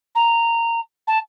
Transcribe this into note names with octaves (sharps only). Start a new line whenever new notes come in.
A#5
A5